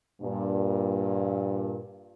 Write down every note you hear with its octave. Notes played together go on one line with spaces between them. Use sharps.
G2 A#2